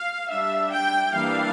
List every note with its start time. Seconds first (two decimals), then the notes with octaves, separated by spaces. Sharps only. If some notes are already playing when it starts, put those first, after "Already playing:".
Already playing: F5
0.30 G3 D4 E5
0.72 G5
1.14 E3 G3 A#3 D4 F5